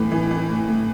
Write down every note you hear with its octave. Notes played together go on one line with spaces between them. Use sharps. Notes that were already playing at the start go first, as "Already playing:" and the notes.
Already playing: A2 E3
E3
E3
A2
A2